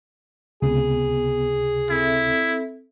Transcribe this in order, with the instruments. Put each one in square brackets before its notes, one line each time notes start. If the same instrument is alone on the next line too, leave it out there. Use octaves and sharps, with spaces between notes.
[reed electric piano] C#2 C3 [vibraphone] B3 [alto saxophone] G#4
[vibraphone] C4 A4 E5 [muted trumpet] E4